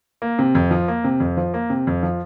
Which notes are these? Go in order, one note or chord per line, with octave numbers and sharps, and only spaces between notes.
A#3
C3
F2
F3
A#3
C3
F2
F3
A#3
C3
F2
F3